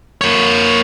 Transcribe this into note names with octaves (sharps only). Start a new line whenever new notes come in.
A#3 C#5